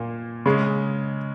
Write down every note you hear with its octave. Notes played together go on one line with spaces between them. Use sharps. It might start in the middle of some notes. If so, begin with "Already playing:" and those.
Already playing: A#2 A#3
C#3 G#3